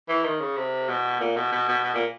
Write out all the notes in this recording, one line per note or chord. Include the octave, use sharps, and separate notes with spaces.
E3
D#3
C#3
C3
B2
A#2
B2
B2
B2
B2
A#2